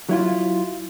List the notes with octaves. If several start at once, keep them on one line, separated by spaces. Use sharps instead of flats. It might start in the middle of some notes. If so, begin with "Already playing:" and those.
F#3 E4 F4